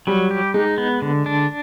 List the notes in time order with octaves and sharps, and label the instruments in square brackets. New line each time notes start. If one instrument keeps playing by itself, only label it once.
[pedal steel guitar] F#3 [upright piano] G3
[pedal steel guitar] G4
[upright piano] G#3 [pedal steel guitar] D#4
[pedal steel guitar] B3
D3
D4